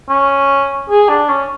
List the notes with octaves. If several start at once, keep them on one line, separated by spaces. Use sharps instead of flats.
C#4
G#4
D4
C#4